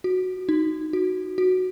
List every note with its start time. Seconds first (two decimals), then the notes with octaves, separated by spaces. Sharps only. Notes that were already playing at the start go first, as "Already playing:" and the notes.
0.04 F#4
0.49 D#4
0.93 F#4
1.38 F#4